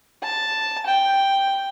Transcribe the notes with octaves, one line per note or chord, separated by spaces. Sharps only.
A5
G5